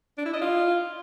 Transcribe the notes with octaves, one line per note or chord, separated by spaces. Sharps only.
D4
E4
D#5
F4